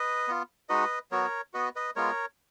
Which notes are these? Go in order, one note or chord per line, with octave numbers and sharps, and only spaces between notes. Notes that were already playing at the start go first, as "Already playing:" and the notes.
Already playing: B4 D#5
B3 F4
G#3 D#4 F#4 B4 D#5
F#3 B3 F#4 A#4 C#5
B3 F#4 B4 D#5
B4 D#5
G#3 B3 F4 A#4 C#5